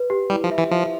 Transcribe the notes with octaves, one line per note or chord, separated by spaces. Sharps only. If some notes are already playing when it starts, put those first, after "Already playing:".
Already playing: B4
G4
G3 E4
F3
E5
E3
F3 E5